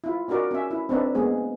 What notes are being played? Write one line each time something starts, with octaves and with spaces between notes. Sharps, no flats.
E4 F4
C#4 D#4 F#4 A#4 D5
C#4 E5
E4
C4 D4 D#4 B4 E5
G#3 A#3 B3 G#4